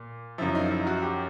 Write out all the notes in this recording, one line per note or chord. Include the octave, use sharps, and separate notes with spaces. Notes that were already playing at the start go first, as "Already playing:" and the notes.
Already playing: A#2
F#2 C#3 F3 E4
D#4
E4
F#4
G4